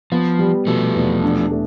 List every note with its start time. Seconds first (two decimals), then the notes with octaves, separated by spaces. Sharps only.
0.12 F3 B3
0.39 G3
0.67 B2 F3 A3
0.95 E2
1.23 D4
1.51 A3